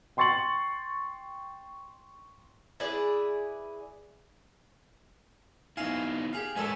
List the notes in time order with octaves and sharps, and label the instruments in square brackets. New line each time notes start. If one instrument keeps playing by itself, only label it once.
[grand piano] G5 C6 C#6 A6 C#7 F#7
[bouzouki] E4 G#4 B4 D5
[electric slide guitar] B3 D#4 E4 [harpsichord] F5 G#5 C6
[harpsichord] G4 G#4 F5
[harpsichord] A2 A4 G#5 [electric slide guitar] G#3 B4 D5